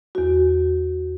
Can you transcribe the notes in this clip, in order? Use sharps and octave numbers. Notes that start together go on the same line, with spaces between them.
E2 F#4